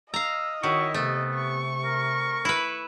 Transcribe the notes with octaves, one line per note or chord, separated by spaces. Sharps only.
D#5 F5 A#5 E6
D#3 E4 F#4 C#5 C#6
C3 A3 B3
C#6
A#4
E4 B4